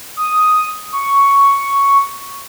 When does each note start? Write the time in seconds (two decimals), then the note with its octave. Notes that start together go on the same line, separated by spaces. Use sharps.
0.17 D#6
0.92 C#6